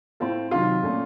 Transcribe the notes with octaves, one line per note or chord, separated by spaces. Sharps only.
A2 A3 C4 F4 A4
C3 D#3 F#3 F4
A#2 A3 C#4 A4